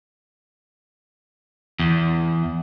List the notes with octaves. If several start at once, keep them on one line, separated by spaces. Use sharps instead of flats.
E2